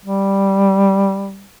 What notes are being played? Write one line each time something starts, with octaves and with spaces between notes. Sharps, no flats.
G3